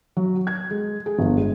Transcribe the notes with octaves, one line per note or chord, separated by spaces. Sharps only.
F#3
G#6
G#3
G#4
G1
G#3